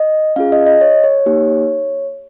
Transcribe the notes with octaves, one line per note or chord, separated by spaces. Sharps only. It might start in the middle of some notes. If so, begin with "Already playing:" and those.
Already playing: D#5
C#4 F4 G#4 F5
D#5
D#5
C#5
C#5
A#3 D#4 G4